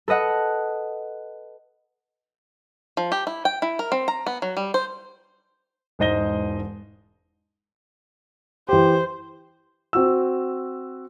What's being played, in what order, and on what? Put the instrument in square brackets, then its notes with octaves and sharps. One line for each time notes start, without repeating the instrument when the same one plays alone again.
[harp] A4 B4 D#5 F#5
[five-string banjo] F3
G4
E4
G5
E4
A#4
C4
A#5
B3
F#3
G3
C5
[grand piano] E1 G#2 C5 D#5 A#6 G7
[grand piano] E3 G4 [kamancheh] C5
[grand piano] C4 F#4 E6